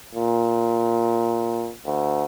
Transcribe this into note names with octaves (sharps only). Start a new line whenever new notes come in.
A#2
D2